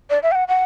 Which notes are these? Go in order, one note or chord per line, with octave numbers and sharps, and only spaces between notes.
D5
E5
G5
F#5
F#5